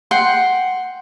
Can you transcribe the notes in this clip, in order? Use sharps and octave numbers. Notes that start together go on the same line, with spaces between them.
F#5 G5 C6